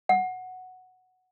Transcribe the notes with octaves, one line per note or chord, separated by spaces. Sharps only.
F#5